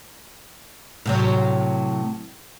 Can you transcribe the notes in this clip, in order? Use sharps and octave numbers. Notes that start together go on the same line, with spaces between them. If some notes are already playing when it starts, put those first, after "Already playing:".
A2 C3 F#3